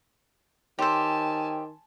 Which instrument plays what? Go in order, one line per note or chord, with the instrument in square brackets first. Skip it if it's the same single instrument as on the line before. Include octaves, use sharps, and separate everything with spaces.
[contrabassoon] D#3 [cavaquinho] G4 C5 [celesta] C#5 C6 E6 [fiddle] G#5 A5